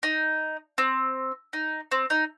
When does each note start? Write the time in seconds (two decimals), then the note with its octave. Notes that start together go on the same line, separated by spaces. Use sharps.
0.03 D#4
0.78 C4
1.53 D#4
1.92 C4
2.10 D#4